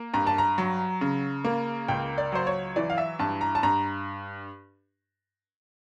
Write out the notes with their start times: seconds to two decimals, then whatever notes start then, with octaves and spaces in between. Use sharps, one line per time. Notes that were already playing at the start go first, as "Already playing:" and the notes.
Already playing: A#3
0.14 G2 A#5
0.27 A5
0.38 A#5
0.58 F#3
1.01 C#3
1.45 A#3
1.88 C#2 G5
2.18 D5
2.32 F#3 C5
2.47 C#5
2.76 E3 D5
2.90 F5
2.98 E5
3.19 G2 A5
3.41 A#5
3.55 A5
3.63 G2 A#5